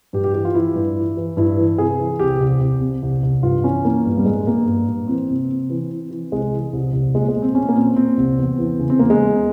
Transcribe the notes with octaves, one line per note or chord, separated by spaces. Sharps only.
G2 G4
G4
E3 G4
F4
E3 E4
G2
E3
E3
G2 E4
E3
C3 G#4
E3
C2 G4
C2
C2
C3
C2
C2
G2 F4
E3 C#4
E3 A#3
G2
G3
G2 G#3
G2 A#3
G2
G2
E3 C4
C3
C3
E3
E3
E3
C2 G#3
E3
C2
C2
A#2 G#3
G#3
A#2
C4
A#2 C#4
A#3
A#2 C4
A#2 C4
C2
E2
E3
C#3
C4
E2 A#3
G#3
E2